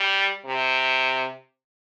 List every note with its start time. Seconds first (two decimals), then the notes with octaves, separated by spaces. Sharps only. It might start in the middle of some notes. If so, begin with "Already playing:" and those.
Already playing: G3
0.46 C3